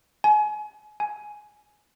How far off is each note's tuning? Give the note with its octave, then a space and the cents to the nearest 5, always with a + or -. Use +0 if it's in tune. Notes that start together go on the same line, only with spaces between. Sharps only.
G#5 +30
G#5 +10